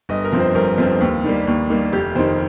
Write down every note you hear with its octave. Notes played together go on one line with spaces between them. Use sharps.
G1 D#5
A#4
F2 F3 C4
C5
G1 A#4
F2 F3 C4 F4
D#2
D#3 G3 A#3
D#2
D#3 G3 A#3
F1 G4
F2 D#3 C5